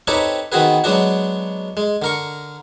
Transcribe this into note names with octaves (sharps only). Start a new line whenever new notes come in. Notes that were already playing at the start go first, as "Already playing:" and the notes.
C4 D#4 G4 A4 B4 C#5
D#3 B3 C4 F#4 G#4 B4
F#3 G#3 B3 D4 F#4
G#3
D3 A#4 C#6